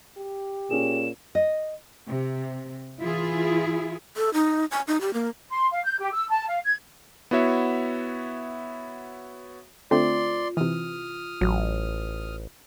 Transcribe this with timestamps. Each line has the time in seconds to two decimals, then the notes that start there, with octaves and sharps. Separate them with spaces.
0.17 G4
0.71 A#2 C#4 G#4 E7
1.35 D#5
2.09 C3
3.01 E3 E4 F4 G#4
4.17 A4
4.34 D#4
4.71 G#5
4.88 D#4
5.01 G4
5.14 A#3
5.50 C6
5.71 F5
5.83 G6
5.98 G4
6.13 E6
6.29 A5
6.48 F5
6.64 G#6
7.31 B3 E4 F#4 C#5 E5
9.91 D3 A3 C4 F4 D5 C6
10.57 C3 E3 D#6 F6
11.41 A1 F#3